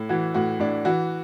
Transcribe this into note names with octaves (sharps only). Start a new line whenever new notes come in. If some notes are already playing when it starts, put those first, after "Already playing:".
Already playing: A2
E3 F#4
A2 F#4
A2 D4
E3 F#4